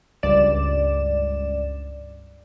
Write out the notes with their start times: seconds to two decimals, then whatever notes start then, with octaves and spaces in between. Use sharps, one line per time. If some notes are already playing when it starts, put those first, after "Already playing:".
0.23 C#2 G2 D5 E7